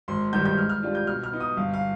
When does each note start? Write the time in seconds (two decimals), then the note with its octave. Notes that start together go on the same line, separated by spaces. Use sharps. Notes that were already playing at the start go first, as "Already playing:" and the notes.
0.08 G#1 C6
0.33 G2 D#3 G3 G6
0.45 G6
0.57 G#2 F6
0.69 F6
0.82 G3 D4 F4
0.95 G6
1.07 B2 F6
1.24 F6
1.32 B3 D#4
1.40 D#6
1.57 G1 F5
1.74 F5